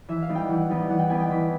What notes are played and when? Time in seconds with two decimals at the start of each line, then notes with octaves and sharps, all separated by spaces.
0.09 E3 E5
0.22 F5
0.29 G3 B3 D#4
0.35 G5
0.48 E3 F#5
0.69 G3 B3 D#4
0.90 E3 F#5
0.99 G5
1.09 G3 B3 D#4 G#5
1.20 G5
1.30 E3 B5